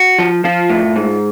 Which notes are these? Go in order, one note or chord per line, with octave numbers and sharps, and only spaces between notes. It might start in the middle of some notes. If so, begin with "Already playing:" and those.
Already playing: F#4
F3
F3 F4
A2
G#2